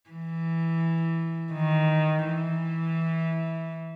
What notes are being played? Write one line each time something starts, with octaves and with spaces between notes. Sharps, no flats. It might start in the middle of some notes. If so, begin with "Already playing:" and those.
E3
D#3
E3